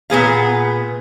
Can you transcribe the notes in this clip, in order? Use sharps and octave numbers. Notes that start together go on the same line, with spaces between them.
A#2 B3 G#4 F5